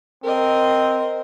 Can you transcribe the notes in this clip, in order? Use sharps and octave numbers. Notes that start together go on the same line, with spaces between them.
C4 A#4 D#5